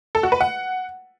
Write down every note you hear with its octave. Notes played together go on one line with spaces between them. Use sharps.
A4
F#4
B4
F#5